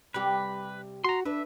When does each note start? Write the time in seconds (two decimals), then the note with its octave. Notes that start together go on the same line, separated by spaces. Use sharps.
0.14 C3 G3 G4 B4
1.04 F#4 A#5 C6
1.25 D4 B4 E5